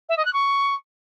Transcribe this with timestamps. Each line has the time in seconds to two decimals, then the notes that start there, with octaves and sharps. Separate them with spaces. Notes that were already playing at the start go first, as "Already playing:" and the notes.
0.09 E5
0.17 D#5
0.25 F#6
0.33 C#6